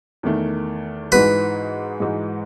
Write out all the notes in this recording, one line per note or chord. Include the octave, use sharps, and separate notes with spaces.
E2 D#3 A3
G#2 E3 G#3 D#4 F#4 B4
G#2 E3 G#3 D#4 F#4